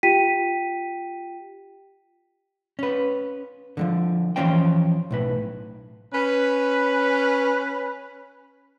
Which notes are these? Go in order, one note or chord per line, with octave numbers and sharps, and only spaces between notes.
F4 G4 G5 B6 D#7
C#4 B4
D3 E3 F3
E3 F3 C#4 C5 G5
B1 A2 B4
C#4 B4